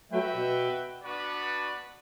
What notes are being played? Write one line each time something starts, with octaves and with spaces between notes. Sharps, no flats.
F#3 A3 F#4 B4 E5 G5
B2
B3 D4 F#4 B4 D5